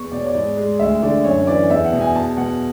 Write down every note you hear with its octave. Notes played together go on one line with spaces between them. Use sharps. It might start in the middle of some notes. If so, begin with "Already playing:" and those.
Already playing: E2 C#6
B2 D5
C#5
D5
G#2
G#3
D2 E5
D3 D5
F#2 C#5
E3 D5
E2 E5
F#5
B2
G#5
E2 A5
B2 F#5